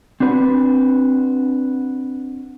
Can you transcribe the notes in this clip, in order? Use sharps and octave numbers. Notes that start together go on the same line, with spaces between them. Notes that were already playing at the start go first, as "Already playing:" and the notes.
C4 D4 F#4 B4